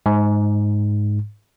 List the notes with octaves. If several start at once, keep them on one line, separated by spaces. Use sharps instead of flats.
G#2